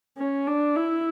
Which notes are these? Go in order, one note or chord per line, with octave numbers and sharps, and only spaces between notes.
C#4
D4
E4